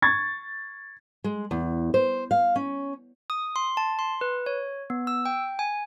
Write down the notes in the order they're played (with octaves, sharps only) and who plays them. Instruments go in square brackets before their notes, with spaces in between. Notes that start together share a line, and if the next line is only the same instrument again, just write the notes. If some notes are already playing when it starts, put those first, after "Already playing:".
[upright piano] C#6 G#6 A6
[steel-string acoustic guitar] G#3
E2
C5
F5
C#4
[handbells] D#6
C6
A5
C6
B4
C#5
B3
E6
G5
G#5